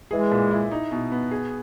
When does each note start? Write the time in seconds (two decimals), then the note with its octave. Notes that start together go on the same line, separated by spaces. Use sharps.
0.11 E3 G#3 G#4
0.31 A#2
0.51 E4
0.71 D#4
0.91 B2
1.12 B3
1.31 G#4